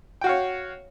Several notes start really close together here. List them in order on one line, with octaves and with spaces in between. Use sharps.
G5 F#4 F5 C#5